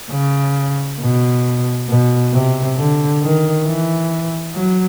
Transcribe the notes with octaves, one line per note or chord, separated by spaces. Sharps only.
C#3
B2
B2
C3
D3
D#3
E3
F#3